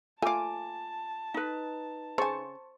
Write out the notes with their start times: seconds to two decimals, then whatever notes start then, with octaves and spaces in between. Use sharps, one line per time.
0.22 A3 F4 F5 G#5 A5 D6
1.34 D#4 B4
2.18 C#3 C5 G#5 A5 C#6